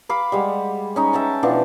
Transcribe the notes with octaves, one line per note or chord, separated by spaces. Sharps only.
F5 B5 D6
G3 G#3 F#5
C#4 D#4 A#5
E5 G5 A5 A#5
B2 E3 F3 D4